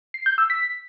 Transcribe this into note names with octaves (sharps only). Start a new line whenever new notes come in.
C7
G6
E6
B6